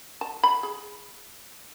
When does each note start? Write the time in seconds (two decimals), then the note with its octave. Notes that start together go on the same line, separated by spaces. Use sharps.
0.21 A5
0.44 B5
0.63 G#4